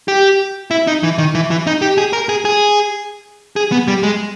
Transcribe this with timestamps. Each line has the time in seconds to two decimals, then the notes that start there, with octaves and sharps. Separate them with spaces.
0.08 G4
0.71 E4
0.87 D#4
1.03 E3
1.18 D#3
1.35 E3
1.51 E3
1.67 D#4
1.82 G4
1.98 G#4
2.13 A#4
2.29 G#4
2.45 G#4
3.56 G#4
3.72 B3
3.88 G3
4.03 G#3